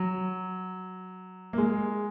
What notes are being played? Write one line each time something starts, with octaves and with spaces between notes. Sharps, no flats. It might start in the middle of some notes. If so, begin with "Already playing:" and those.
Already playing: F#3
A#3
G#3